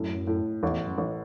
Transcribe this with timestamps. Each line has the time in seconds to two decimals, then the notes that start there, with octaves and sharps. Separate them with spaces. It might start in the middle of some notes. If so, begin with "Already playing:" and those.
Already playing: F#2 A2
0.27 A2
0.63 A1 E2
0.86 F#2
0.98 A1